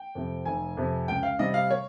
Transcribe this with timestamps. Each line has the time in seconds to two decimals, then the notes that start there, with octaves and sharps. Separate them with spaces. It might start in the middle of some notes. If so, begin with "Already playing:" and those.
Already playing: G5
0.15 F2 C3
0.45 F1 G#5
0.77 F2 C3
1.08 C#2 G5
1.23 F5
1.39 C3 G3 D#5
1.54 F5
1.70 C#5